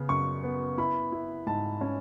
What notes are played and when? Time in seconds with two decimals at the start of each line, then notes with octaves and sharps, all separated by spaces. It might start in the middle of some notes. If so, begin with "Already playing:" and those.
Already playing: C#3 B3
0.09 F#2 C#6
0.44 B3
0.78 E4 B5
1.12 E4
1.46 G#2 A5
1.81 C#4